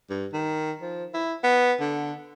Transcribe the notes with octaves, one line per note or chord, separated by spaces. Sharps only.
G2
D#3
F3
E4
B3
D3